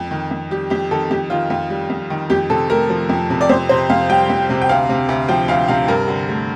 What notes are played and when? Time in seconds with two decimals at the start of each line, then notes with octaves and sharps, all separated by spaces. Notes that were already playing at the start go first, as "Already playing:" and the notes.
Already playing: F2
0.11 D#3
0.31 F2
0.50 G3 G4
0.70 F2 G4
0.91 D#3 A4
1.11 F2 G4
1.30 D#3 F4
1.50 F2 F4
1.70 G3
1.90 F2
2.10 D#3
2.30 F2 G4
2.50 C3 A4
2.70 A3 A#4
2.89 F3
3.09 F2
3.30 C3
3.41 D5
3.49 F2 C5
3.69 C3 C5
3.90 F2 F5
4.09 G3 G5
4.29 F2
4.50 C3
4.62 G5
4.69 D2 F5
4.89 C3
5.09 D2
5.29 F3 G5
5.48 D2 F5
5.68 C3 F5
5.88 G2 A#4
6.08 D3
6.29 A3